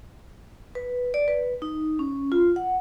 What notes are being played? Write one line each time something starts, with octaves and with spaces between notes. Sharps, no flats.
B4
D5
B4
D#4
C#4
F4
F#5